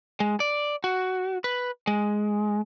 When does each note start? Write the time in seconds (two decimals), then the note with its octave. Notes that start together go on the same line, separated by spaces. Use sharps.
0.20 G#3
0.40 D5
0.84 F#4
1.44 B4
1.87 G#3